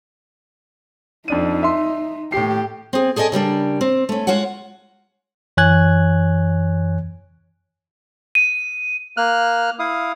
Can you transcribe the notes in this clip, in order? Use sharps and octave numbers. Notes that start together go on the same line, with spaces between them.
F2 D4 D#4 D#7
E5 C6
A2 G4 C7
C4 G#4
G#4 A4 D5 D#5 G#5
C#3 G3 A#3 D4
C4
A3 C#4
G#3 F4 F#4 C#5 F#5
F#2 E3 C#5 G#5 F#6 G#6
D#7
A#3 F6 F#6
E4 F5 D#6